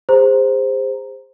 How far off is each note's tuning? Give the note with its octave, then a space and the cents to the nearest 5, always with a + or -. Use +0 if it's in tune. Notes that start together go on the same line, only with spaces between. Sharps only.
G#4 -45 C5 +0 A#5 +0